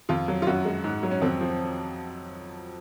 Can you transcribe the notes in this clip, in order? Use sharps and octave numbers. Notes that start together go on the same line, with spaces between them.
F2 F4
F#3
F4
F#2 F#4
G#3
G#2
F#3
C#4
F2 C4
F3